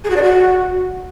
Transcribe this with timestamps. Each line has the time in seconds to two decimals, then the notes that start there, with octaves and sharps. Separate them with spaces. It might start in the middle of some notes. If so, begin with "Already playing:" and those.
0.04 G#4
0.10 F#4
0.16 D5
0.22 F#4